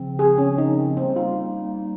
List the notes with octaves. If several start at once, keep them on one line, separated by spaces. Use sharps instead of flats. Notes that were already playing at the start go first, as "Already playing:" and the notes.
Already playing: C#3 F3 C4
G#4
C#4
D#4
G3 A#3 C4 D#4
F4